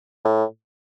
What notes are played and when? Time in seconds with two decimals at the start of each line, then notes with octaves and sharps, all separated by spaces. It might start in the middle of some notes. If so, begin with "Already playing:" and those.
0.25 A2